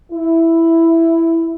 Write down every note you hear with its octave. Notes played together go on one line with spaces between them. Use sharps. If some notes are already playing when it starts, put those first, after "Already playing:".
E4